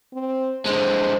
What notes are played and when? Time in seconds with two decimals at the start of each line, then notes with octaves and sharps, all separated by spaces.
0.14 C4
0.66 D3 G#3 C5